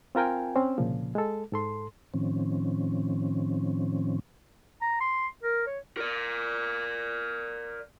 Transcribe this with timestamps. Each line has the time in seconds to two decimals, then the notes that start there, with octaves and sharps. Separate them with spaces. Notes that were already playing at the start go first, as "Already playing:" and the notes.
0.15 C4 F4 A#4 G5 G#5
0.56 C4 C#4
0.78 C2 A#2 C#3 F3
1.15 G#3 A4
1.52 G#2 A4 C6
2.14 A2 D#3 F3 C4 C#4
4.82 A#5
5.01 C6
5.43 A#4
5.67 C#5
5.97 A#4 D5